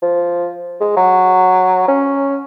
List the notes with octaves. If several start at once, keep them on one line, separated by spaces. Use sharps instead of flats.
F3
G#3
F#3
C#4